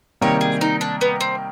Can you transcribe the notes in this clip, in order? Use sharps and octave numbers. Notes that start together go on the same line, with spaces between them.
C3 D#3 G3 A#3 C#5
G#4
D#4
D4
B3
C4